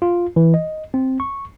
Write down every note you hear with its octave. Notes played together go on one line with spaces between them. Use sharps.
F4
E3
D#5
C4
C#6